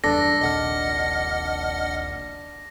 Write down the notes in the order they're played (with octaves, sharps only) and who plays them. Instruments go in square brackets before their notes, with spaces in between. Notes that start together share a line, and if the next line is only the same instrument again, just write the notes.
[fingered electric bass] F#1 E2 G2 [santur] D4 [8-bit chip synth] A4 [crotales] A#6
[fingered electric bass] D#1 A#1 C3 [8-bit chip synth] D#5 F#5 F6